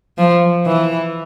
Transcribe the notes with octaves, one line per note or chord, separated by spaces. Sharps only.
F3
E3